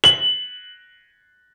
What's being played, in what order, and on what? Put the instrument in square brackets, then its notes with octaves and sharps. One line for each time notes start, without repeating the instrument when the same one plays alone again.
[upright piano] F#7